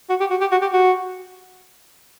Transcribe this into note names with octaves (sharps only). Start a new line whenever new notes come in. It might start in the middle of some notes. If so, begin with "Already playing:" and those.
F#4
G4
F#4
G4
F#4
G4
F#4